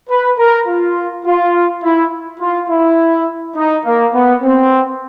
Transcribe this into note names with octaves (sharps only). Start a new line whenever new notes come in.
B4
A#4
F4
F4
E4
F4
E4
D#4
A#3
B3
C4